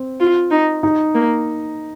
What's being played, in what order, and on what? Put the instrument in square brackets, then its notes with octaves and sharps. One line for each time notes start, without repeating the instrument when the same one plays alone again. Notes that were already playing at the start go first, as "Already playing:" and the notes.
Already playing: [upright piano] C4
[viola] F4
D#4
[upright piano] D#4
[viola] A#3